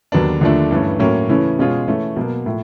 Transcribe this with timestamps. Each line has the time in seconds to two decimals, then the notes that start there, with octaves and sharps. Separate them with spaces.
0.12 D#2 D3 F#3 B3 D4
0.41 D#2 D3 F3 A3 D4
0.71 G2 E3 A3 C#4
0.99 A2 F#3 A#3 C#4
1.29 C#3 E3 A3 C#4 E4
1.59 B2 G#3 C#4 F4 G#4
1.88 E3 A3 C#4
2.17 B2 F#3 A#3
2.46 A2 F3